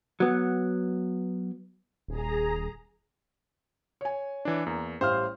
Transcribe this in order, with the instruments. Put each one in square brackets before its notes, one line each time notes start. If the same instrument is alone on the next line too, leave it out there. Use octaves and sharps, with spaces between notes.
[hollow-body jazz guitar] F#3 B3
[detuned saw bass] D#1 [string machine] G#4 A#5
[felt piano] C#5 G#5
[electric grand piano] E3 D4
[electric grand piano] E2 [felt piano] A#3
[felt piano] A1 G3 [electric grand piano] C5 F5 F6